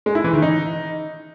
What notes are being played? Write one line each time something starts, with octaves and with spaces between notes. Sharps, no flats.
G#3
E4
E3
D#3
D#4